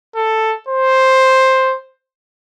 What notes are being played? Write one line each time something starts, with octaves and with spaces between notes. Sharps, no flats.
A4
C5